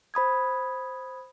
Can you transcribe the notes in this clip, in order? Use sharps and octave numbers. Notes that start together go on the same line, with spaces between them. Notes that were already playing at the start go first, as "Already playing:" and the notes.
C5 B5 D#6 G#6